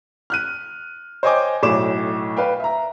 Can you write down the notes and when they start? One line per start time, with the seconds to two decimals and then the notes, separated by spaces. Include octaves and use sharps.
0.30 F6 F#6 D#7
1.23 C5 C#5 D#5 G5 G#5 D6
1.63 B1 A2 C#5 D6 E7
2.37 B4 F5 G5
2.60 E5 A#5